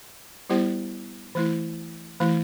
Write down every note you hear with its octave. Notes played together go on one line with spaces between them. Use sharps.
G3 B3 E4 G4 C5
E3 A3 E4
E3 A3 E4